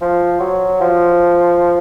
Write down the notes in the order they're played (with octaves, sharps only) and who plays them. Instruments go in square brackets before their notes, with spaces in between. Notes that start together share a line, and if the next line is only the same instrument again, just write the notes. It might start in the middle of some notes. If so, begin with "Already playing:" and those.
[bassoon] F3
F#3
F3